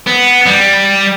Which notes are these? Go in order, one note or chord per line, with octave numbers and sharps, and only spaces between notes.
B3
G3